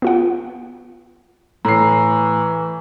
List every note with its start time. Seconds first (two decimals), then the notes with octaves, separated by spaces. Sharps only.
0.02 B3 F4 F#5
1.65 A2 E3 A#5 C7